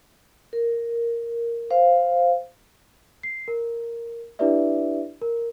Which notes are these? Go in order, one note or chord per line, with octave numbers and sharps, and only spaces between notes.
A#4
C5 F5
C7
A#4
D4 E4 G4 B4 D5 E5
A#4